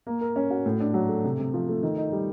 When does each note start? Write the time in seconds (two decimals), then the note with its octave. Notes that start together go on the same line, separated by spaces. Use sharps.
0.07 A#3
0.21 A#4
0.36 C#4
0.50 F#4
0.66 A2
0.80 D4
0.94 F#3
1.09 A3
1.24 C3
1.39 C3
1.54 F3
1.69 A3
1.83 D#3
1.97 D#4
2.12 G3